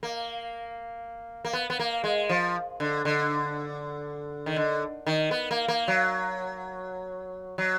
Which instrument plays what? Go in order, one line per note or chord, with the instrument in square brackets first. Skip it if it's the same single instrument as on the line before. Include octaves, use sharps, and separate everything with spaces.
[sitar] A#3
A#3
B3
B3
A#3
G#3
F3
D3
D3
D#3
D3
D#3
B3
A#3
A#3
F#3
F#3